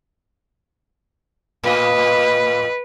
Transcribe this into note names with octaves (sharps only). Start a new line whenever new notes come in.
A2 B4 D#5